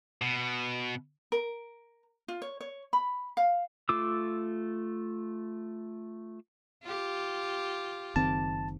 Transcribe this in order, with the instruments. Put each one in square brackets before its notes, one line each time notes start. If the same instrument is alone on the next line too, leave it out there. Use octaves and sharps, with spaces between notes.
[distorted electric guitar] B2
[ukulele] A#4
F4
C#5
C#5
B5
F5
[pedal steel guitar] A3 F4 D6 E6
[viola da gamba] F4 G4
[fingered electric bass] F#1 D#3 C4 [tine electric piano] A5